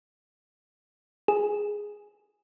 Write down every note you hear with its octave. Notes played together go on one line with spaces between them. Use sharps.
G#4